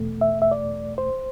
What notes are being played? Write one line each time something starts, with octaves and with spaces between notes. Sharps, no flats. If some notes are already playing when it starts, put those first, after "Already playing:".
Already playing: E2 B2 A3
E5
E5
D5
C5